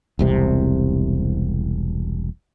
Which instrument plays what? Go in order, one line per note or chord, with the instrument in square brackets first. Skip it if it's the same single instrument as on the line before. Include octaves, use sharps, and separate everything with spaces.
[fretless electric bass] E1 C2 C3